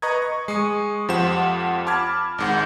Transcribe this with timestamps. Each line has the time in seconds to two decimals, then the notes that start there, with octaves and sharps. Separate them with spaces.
0.02 B4 D#5 A#5 C#6 D#6 G#6
0.22 C#6
0.48 G#3 C#6 D#6
1.09 F2 F3 G4 C5 F#5 E7
1.87 A5 B5 D6 F6 G#6
2.38 G#1 G#2 F#5